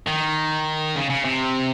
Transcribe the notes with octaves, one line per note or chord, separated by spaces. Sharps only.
D#3
C#3
C#3
C3